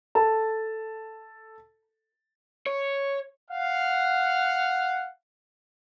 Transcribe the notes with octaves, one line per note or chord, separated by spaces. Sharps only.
A4 A5
C#5
F5 F#5